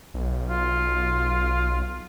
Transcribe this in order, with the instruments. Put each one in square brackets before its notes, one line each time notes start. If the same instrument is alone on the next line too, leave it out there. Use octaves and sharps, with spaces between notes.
[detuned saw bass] B1
[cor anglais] F4